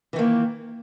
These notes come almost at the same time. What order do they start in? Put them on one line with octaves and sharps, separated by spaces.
E3 D#3 A#3